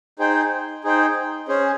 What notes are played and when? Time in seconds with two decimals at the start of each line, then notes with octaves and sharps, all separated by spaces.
0.19 D#4 G#4 C5 G5
0.84 D#4 G#4 C5 G5
1.48 C#4 G#4 C5